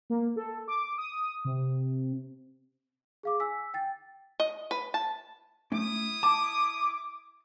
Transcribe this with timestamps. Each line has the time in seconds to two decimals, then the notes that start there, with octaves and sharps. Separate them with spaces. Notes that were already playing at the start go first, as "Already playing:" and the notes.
0.10 A#3
0.36 A4
0.68 D6
0.98 D#6
1.45 C3
3.23 G#4 F5 D6
3.40 G#5 E6 B6
3.74 G5 A6
4.40 D#5
4.71 B4
4.94 A5
5.72 A3 C#4 E4 D#6
6.23 A5 D6